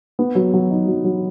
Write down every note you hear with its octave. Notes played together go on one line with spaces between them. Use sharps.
B3
F#3
F#3
D#4
F#3
F#3